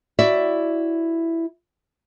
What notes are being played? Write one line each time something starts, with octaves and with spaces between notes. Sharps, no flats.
E4 F#4 D5 E5